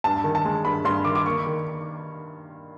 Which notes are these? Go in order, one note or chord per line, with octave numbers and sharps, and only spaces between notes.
G2 A5
D#3
A5
G#3
G2 B5
G2 C6
D#3 D6
D6
A#3 C#6
D#3